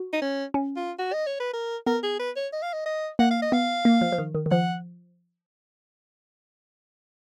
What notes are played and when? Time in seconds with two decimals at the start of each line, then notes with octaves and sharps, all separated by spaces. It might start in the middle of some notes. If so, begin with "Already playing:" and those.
Already playing: F#4
0.13 D#4
0.21 C#4
0.54 C#4
0.76 F4
0.99 F#4
1.13 D#5
1.27 C#5
1.40 B4
1.54 A#4
1.86 B3 A#4
2.03 G#4
2.19 B4
2.36 C#5
2.53 D#5
2.63 F5
2.73 D#5
2.86 D#5
3.19 A#3 F#5
3.31 F5
3.42 D#5
3.52 B3 F5
3.85 A#3
4.01 F3
4.12 F3
4.18 D#3
4.35 D#3
4.46 D#3
4.51 F3 F#5